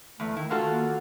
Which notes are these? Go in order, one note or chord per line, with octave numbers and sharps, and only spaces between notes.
E2 A3
D#3 E4
F4 F#4 A4
A#3